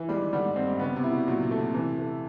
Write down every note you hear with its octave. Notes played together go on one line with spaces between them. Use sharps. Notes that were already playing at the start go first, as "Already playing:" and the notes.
Already playing: E3
G3 G#3
D#3
D3 G3
G#2
G2 C4
G#2
C#3 B3
C3
E4
B2
A#2 F#3
C3
A3
C3
C3 E3
A3